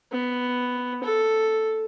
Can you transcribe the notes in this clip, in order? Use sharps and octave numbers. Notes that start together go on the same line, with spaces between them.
B3
A4